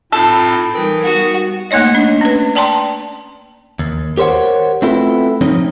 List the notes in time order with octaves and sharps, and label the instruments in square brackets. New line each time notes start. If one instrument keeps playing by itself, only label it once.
[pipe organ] A2 C4 D#4 [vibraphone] F4 B5 [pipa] A4
[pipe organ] E3 G5 [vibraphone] G3 D#4 A#4
[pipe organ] B3 [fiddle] F#4
[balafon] A3 A#3 D#4 C#5 D#5
D4
C#4 B4
D5 G5 A5 A#5 C6
[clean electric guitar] D#2
G4 A#4 C5 C#5 F#5
A3 B3 C4 E4 F4 A4
F3 C4 C#4 D#4